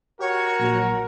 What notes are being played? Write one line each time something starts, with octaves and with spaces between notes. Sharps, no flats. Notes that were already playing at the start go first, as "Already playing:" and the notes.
F#4 G4 A#4 C#5
A#1 A#2 F#3